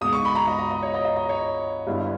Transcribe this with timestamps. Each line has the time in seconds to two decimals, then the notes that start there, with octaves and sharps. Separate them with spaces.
0.01 C#2 B2 G#3 D#4 D#6
0.13 C#6
0.25 B5
0.35 A#5
0.47 D#5
0.59 D#5
0.71 D#5
0.82 C#5
0.94 D#5
1.05 D#5
1.16 D#5
1.29 C#5
1.87 G1 G2 G3 B3 E4